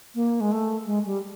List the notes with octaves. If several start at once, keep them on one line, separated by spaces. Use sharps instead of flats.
A#3
G#3
A3
G#3
G3